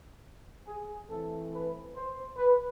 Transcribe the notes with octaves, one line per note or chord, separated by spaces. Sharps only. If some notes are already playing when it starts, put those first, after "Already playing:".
G#4
E3 A3 C4 A4
B4
C5
B4